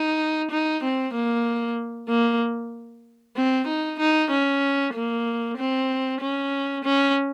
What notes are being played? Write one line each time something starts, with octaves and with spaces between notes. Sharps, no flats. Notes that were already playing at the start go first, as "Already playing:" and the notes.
Already playing: D#4
D#4
C4
A#3
A#3
C4
D#4
D#4
C#4
A#3
C4
C#4
C#4